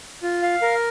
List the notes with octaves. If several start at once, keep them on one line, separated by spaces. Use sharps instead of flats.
F4
F5
A#4